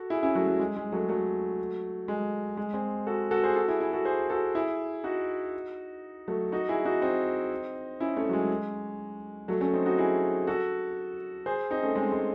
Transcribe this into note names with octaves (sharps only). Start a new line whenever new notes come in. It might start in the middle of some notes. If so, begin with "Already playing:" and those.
Already playing: F#4 A4
E4 G#4
C#4 E4
F#3 A3
F#3
G#3
G#3
F#3 A3
F#3 A3
G#3
G#3
G#3 C4
F#4 A4
F#4 A4
G#4 C5
F#4 A4
E4 G#4
E4 G#4
F#4 A4
G#4 C5
F#4 A4
E4 G#4
D#4 F#4
F#3 A3
D#4 F#4
E4 G#4
D#4 F#4
C4 D#4
C#4 E4
A3 C#4
F#3
G#3
F#3 A3
A3 C#4
C4 D#4
D#4 F#4
E4 G#4
F#4 A4
G#4 C5
C4 D#4
A3 C#4
G#3 C4
G#3